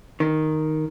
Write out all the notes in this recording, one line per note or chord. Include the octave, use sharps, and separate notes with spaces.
D#3